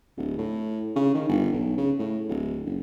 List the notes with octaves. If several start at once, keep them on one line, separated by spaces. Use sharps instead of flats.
D1
A2
C#3
D#3
G1
B1
C#3
A2
D1
F#1